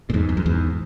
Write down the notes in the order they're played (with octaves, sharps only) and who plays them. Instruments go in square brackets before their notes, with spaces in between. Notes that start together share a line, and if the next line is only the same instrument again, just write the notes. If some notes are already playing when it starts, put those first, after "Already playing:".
[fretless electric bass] A#2
E2 G#2
E2
F#2
E2 G#2